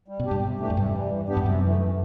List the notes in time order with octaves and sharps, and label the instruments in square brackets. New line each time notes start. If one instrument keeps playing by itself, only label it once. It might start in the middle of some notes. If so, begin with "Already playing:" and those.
[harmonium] G3
[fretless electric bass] B2
[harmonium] D4 G4
[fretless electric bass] G2
[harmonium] C3
E3 A3 D4 G4
[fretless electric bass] F#2
[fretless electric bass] G2 [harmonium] C3
[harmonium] E3 G3
E3
B3 D4 G4
[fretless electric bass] G2
[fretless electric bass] F#2 [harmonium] C3
[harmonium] E3
A3
E3